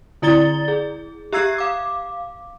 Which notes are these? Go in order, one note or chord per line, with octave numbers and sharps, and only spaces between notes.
D3 E4 D5 A#5 A6 G7
G#4
G4 E5 A#5 E6 G#6 C7
F5 D6